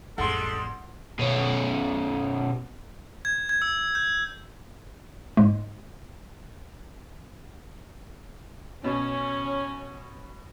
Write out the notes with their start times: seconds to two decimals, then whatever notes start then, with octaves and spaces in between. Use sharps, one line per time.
0.18 A1 F2 G3 G#3 A4 F#5 C6
1.19 B2 C#4
3.25 G#6
3.49 G#6
3.62 E6
3.95 G6
5.37 G#2 G#3
8.84 B2 C#4